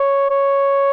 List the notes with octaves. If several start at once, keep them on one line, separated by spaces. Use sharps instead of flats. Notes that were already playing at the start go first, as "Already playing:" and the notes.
Already playing: C#5
C#5